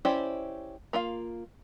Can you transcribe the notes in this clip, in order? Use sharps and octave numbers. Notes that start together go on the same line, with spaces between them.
C#4 E4 G4 C5 D5
A#3 F4 F5